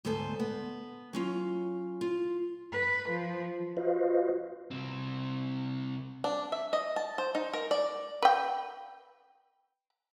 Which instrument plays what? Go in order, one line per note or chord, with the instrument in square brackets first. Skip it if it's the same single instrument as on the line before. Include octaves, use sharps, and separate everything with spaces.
[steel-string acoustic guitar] D2 G#2 B3 A4 C5 G#5
B3
F#3 C#4 F4
F4
[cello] B4
F3
[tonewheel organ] F4 F#4 B4 C5 D#5 F5
[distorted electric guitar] C2 C4
[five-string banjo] D4
E5
D#5
A5
C5
D#4
A#4
D5
[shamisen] B4 G5